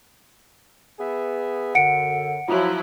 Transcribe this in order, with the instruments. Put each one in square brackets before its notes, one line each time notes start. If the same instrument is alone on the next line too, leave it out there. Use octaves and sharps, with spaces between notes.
[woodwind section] B3 G#4 E5
[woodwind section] F#2 D3 [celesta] F#5 C#7 D7
[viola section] F3 F#3 E4 [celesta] F4